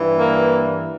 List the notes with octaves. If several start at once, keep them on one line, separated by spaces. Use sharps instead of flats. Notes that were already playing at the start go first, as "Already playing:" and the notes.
Already playing: G2 E3
A#3